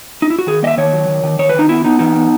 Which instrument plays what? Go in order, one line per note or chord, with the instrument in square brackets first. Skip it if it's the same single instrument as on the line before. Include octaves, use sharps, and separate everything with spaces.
[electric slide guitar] D#4
E4
F#4
D#3 G#4
A#3 D#5
E5
D#3 C#5
F#3
D#3
D#3
D#3 C#5
D#3 B4
D#4
B3 E4
B3 D#4
E3 D#4
B3